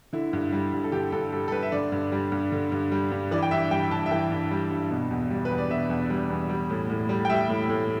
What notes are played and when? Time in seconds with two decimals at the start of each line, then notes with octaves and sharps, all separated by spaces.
0.13 D3 E4
0.33 G2
0.52 G3
0.73 G2
0.84 A4
0.92 D3 G4
1.12 G2 A4
1.33 G3 A4
1.48 A4
1.52 G2 B4
1.63 E5
1.72 D3 D5
1.92 G2
2.12 G3
2.32 G2
2.52 D3
2.72 G2
2.92 G3
3.12 G2
3.31 E3 D5
3.42 G5
3.51 G2 E5
3.71 G3 G5
3.91 G2 A5
4.06 E5
4.11 E3 G5
4.31 G2
4.51 G3
4.71 G2
4.91 B2
5.11 E2
5.30 G3
5.45 B4
5.51 E2
5.58 D5
5.70 B2 E5
5.90 E2
6.10 G3
6.30 E2
6.49 G3
6.70 A2
6.90 A2
7.09 G3
7.25 G5
7.29 G3 E5
7.49 A2
7.69 A2